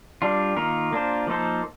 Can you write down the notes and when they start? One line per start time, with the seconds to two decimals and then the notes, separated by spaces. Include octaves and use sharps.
0.22 G3 D4 F4
0.57 D#3 A#3 F4 A#4
0.93 A#3 D4 F4 C5
1.27 F3 A#3 D#4 A4 C5